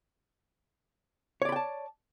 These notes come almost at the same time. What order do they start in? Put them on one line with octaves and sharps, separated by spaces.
C#5 D5 B5 G5 A5